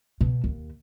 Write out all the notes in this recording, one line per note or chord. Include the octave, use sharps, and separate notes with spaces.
B2
D#2